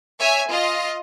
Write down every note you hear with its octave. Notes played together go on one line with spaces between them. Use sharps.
C#5 E5 G#5
F4 D#5